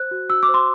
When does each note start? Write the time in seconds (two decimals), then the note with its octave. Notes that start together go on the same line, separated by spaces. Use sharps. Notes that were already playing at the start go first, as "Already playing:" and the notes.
Already playing: C5 F#6
0.11 F#4
0.29 F#4 E6
0.43 D6
0.49 C5
0.54 C6